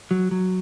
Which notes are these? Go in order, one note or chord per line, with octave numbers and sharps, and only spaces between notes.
F#3
F#3